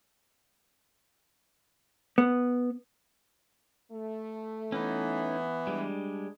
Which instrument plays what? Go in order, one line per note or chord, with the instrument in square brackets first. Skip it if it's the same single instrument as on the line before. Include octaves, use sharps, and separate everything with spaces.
[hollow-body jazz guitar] B3
[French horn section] A3
[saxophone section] E3 B3 [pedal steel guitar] C#4 D#4
[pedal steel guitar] G3 G#3 [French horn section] D4